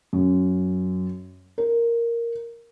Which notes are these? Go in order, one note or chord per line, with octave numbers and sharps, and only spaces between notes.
F#2
A#4